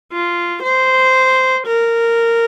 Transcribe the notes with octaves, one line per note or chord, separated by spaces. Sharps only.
F4
C5
A#4